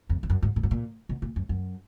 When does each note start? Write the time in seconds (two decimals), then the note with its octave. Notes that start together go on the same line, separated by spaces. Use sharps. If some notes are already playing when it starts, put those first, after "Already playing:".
0.09 F2
0.23 F2
0.30 F#2
0.42 G#2
0.56 A#2
0.63 G#2
0.71 A#2
1.09 B2
1.22 A#2
1.36 F#2
1.49 F#2